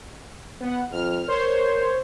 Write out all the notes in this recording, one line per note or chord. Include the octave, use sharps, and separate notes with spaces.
B3 F#5
F2 F6
A#4 C5 C#5 C6